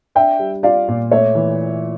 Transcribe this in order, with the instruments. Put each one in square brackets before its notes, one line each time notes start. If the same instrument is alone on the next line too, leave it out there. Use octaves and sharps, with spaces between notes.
[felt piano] D4 [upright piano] E5 G5
[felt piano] G3
[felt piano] F4 [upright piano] D5 F5
[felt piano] A#2
[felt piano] A3 [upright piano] C#5 E5
[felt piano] E3